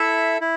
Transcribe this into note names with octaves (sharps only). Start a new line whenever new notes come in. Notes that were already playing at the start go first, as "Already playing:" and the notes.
Already playing: E4 A4 E5
E4